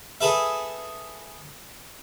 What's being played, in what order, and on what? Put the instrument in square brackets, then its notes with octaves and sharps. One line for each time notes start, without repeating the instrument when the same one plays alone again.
[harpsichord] G#4 A4 B4 E5